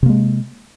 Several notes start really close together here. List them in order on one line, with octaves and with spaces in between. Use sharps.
C3 A#3 G#3